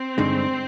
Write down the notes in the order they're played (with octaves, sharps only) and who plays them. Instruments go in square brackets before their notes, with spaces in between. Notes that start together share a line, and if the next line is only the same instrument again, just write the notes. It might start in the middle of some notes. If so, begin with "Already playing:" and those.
Already playing: [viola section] C4
[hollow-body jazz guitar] G2 D3 G#3 D#4